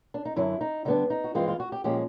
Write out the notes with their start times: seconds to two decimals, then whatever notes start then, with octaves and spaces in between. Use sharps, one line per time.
0.14 D4
0.25 D#4
0.36 F#2 D3 F#3 E4
0.61 D#4
0.85 D3 G3 B3 D4 D#4
1.10 D#4
1.24 F#4
1.34 G2 E3 G#3 C4 F4
1.48 F4
1.60 F#4
1.72 G4
1.84 A#2 F3 G#3 C#4 G4